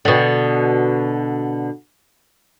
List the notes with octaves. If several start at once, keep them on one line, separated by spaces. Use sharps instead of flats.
B2 D3